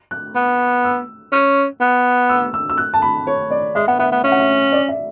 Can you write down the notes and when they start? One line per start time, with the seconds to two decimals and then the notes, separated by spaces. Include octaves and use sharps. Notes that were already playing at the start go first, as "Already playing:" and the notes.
0.11 F#6
0.35 B3
0.84 E6
1.32 C#4
1.81 B3
2.29 E6
2.54 E6
2.69 E6
2.78 F#6
2.94 A5
3.02 B5
3.27 C#5
3.51 D5
3.75 G#3 E5
3.88 B3 F#5
3.99 B3 E5
4.12 B3
4.24 C#4 E5
4.32 F#5
4.40 E5
4.72 D5
4.88 E5